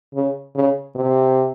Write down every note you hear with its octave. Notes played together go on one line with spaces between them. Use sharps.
C#3
C#3
C3